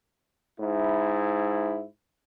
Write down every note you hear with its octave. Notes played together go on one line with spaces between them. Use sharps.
G#2 E4